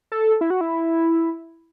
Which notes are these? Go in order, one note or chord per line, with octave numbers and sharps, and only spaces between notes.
A4
E4
F#4
E4